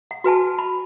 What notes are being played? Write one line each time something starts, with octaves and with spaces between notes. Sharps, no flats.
F#5
F#4 B4 G#5 A5
B5